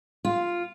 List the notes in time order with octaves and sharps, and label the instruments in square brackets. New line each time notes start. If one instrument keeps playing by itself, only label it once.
[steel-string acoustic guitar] F4